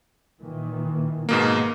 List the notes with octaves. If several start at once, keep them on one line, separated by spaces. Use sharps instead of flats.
A#2 D#3 E3
G#2 B2 A#3 B3